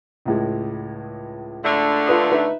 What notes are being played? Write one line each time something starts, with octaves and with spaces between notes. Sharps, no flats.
C#2 A2 G#3
D3 A3
F4 B4 D#6
D#4 B4 E5